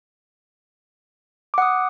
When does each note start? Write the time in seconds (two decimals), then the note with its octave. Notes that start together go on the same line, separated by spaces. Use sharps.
1.54 D6
1.58 F#5
1.62 D#6